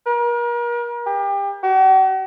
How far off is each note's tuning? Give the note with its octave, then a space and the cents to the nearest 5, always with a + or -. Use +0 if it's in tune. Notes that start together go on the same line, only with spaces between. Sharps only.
A#4 +40
G4 +30
F#4 +45